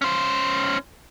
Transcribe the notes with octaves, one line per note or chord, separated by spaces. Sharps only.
C#4 C5